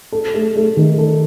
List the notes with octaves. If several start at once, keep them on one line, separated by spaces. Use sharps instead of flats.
A4
A3
A3
D#3
A4